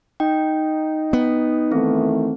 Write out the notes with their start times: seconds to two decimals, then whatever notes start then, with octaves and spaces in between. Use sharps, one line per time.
0.20 D#4 G5
1.13 B3
1.72 D#3 E3 A3 C4